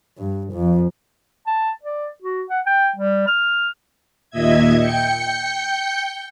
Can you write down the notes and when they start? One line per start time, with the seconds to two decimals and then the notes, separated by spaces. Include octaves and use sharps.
0.18 G2
0.53 F2
1.46 A5
1.83 D5
2.22 F#4
2.50 F#5
2.66 G5
2.96 G3
3.27 F6
4.30 D#2 A#2 D#5 E5 G#6
4.78 G5 G6 C#7